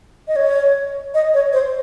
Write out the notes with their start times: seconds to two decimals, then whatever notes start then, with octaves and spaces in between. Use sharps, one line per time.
0.28 D#5
0.36 C#5
1.14 D#5
1.34 C#5
1.53 C5